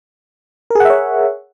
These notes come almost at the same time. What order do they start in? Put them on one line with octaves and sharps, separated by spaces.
A#4 G#4 F#5 E5 C#5